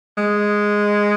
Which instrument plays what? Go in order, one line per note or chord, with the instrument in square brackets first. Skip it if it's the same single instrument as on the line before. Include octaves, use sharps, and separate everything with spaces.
[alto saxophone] G#3